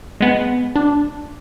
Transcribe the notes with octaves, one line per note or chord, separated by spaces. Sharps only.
G#3 B3
D4